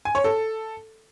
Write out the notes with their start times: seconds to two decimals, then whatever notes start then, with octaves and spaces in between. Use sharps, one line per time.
0.05 G#5
0.15 C#5
0.24 A4